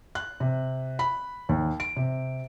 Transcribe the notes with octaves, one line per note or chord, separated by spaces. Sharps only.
F#6
C3
B5
D#2
D7
C3